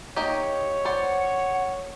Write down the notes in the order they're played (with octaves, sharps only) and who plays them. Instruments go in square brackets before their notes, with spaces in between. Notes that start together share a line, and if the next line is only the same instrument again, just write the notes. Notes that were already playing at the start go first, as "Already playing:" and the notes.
[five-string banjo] A#3 D#4 G4 [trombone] C#5
[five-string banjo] C5 D5 [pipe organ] F#5